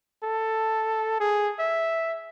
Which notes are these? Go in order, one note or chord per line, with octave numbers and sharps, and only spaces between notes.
A4
G#4
E5